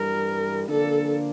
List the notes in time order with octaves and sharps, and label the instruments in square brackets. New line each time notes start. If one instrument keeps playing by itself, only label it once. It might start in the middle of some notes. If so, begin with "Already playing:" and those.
Already playing: [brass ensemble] G2 E3 G3 [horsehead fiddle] A#4
[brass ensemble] D3 F3 A#3 D4 [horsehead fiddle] A4